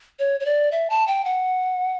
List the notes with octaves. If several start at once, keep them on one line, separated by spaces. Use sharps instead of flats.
C#5
C#5
D5
E5
A5
G5
F#5